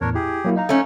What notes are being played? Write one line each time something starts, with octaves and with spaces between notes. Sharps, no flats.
E2 A2 D4 A#4 C#5
E4 G4 G#4
F#3 A#3 E4
D#4 D#5 F5 A#5
A3 C#4